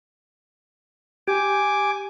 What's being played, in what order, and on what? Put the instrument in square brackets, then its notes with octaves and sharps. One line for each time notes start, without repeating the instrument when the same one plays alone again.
[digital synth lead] G4 [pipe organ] G#5 D6